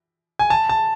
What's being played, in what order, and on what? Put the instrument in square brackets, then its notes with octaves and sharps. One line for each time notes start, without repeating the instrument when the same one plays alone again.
[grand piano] G#5
A5
A5